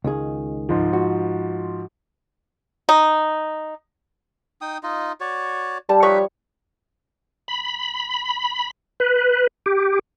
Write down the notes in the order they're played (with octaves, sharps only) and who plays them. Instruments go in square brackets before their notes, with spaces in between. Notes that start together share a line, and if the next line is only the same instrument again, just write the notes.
[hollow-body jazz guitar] C#2 D#3 G#4
[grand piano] G#2 F3
[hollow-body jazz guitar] F#4
[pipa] D#4
[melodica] D#4 G5 D#6
D#4 F4 D#5
F#4 C#5 D5
[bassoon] G3 [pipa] A5
[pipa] F3 C#5 C#6 [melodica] D#4 B4 E5
[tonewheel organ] B5
B4
G4